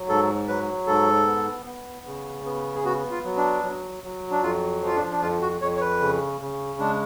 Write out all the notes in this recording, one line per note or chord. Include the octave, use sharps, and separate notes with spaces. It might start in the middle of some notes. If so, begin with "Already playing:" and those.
Already playing: F#3
G#2 A4
F#3 B4
G#2 A4
B3
B3
C#3
B3
G#4
B3 F#4
F4
F#3
D4
F#3
F#3
D4
F2 F4
F3 F4
D4
D4
F2 F4
F#4
F2 C#5
C#5
B4
C#3
C#3
G#3 D4